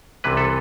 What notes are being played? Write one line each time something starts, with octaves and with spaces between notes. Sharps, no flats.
C2 C3 E3 B4
A4